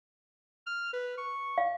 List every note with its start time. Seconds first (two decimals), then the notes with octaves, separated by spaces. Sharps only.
0.66 F6
0.93 B4
1.18 C#6
1.58 F5